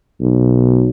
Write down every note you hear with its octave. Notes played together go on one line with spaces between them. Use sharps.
B1